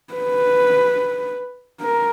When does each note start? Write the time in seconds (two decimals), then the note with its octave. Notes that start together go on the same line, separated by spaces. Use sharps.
0.14 B4
1.81 A#4